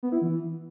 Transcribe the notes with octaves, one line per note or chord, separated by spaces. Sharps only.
B3
E4
E3